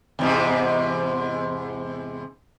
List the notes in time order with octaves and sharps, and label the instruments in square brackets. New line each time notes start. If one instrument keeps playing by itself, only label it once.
[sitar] E2 G#2 C3